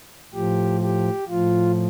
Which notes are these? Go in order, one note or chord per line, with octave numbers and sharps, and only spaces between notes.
A2 F3 G4
G4
A2 F3 F4